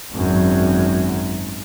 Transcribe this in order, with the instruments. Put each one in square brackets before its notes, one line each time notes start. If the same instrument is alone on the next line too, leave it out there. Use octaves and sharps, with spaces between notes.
[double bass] G#1 F#2